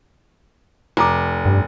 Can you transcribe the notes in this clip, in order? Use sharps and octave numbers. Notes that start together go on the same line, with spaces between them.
F1 A5 A#5 D6
G2